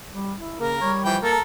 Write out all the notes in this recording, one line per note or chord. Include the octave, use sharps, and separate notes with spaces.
G3
E4
C#3 A#3 A#4
G3 C#5
E3 F3 G5
A#3 A4 A#4